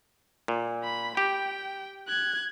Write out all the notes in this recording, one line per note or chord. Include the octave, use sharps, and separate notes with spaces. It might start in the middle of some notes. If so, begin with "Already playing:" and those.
A#2
B5
G4 G5
F#6 G#6